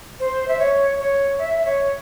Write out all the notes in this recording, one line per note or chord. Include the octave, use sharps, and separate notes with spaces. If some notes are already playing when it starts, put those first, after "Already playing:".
C5
E5
C#5
C#5
E5
C#5